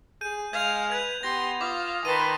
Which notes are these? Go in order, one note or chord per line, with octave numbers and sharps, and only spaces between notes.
G#4 G6 D#7
G#3 F5 G#6 F7
B4 G#6
B3 G4 C6 A#6
F4 F5 D6 D#6
D#3 B4 A5 C6 D#7